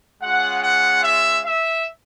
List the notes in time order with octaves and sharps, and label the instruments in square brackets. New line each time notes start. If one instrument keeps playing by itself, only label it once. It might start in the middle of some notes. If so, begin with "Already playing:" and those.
[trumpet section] G#3 C#4 F4 F#5
F#5
E5
E5